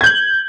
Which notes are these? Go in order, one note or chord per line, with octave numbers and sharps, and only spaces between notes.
G6 G#6 F#7